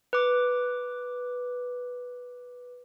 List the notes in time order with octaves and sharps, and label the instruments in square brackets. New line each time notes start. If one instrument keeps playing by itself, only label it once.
[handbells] B4 D6